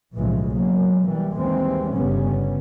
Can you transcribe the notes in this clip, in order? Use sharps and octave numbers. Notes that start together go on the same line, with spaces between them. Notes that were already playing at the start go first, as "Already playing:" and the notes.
B1 A2 C#3 E3 F3 G#3
B2 F#3 G#3 A#3
E3 G3
D#2 E3 G3 G#3 C4
G1 C#3 G3 B3 C#4